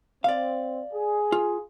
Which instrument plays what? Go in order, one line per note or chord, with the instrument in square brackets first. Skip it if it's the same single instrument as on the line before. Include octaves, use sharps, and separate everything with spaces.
[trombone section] C4 [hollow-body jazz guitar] D5 F5
[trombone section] G#4
[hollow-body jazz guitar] F4